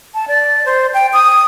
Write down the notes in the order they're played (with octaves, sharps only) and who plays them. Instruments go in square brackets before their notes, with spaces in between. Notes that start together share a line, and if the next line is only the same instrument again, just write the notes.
[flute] A5
D5
C5
G5
D#6